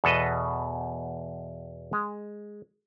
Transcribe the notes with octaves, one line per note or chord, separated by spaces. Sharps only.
E2 B2 A4 B4 D#5
G#3